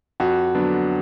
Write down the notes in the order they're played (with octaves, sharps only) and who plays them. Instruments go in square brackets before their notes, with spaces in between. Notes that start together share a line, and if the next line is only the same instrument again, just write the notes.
[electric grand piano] F2 [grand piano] F#4
[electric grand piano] D3 F#3 B3 D4